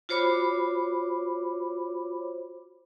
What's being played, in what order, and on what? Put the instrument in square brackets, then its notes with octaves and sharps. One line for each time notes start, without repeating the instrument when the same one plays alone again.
[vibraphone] F4 F#4 C5 C#5 B5 D6